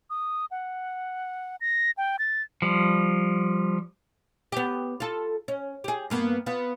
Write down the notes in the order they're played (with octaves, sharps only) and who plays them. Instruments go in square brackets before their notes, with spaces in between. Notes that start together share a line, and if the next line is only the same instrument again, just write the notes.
[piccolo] D#6
F#5
A#6
G5
A6
[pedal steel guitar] F3 G3
[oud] B3 G4
F4 A4
C#4
G4 G#4
G2 A#3 B3
B3 F4